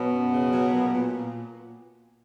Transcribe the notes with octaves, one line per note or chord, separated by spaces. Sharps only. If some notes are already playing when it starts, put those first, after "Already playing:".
Already playing: B2 F#3 B3
F#2
C#3
F#3
A#2
A#2
A#2